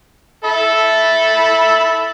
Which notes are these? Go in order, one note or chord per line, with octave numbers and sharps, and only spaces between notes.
A4 E5 B5